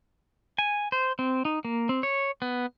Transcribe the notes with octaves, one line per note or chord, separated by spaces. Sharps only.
G#5
C5
C4
D#4
A#3
C4
C#5
B3